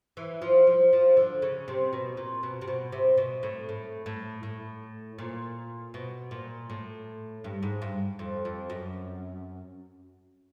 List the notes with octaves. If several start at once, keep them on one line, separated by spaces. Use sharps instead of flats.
E3
F3
F3
F3
D3
C#3
C3
B2
A#2
B2
C3
B2
C3
B2
A2
A2
A2
A2
A#2
B2
A#2
A2
G2
G#2
G2
F2
F2
F#2